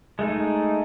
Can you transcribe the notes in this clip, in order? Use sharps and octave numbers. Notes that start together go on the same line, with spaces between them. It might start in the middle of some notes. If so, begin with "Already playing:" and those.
G#3 A3 D#4